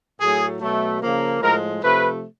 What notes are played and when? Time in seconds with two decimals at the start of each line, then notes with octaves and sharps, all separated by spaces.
0.19 A2 F#3 A3 G#4
0.60 B2 F#3 A3
1.01 C#3 F3 A#3
1.41 A2 F3 G#3 A#4
1.82 C3 F3 A3 B4